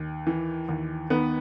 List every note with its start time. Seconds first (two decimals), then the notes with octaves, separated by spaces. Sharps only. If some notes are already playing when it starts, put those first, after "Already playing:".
Already playing: D#2
0.27 E3
0.69 D#2
1.10 D#3 B3 B4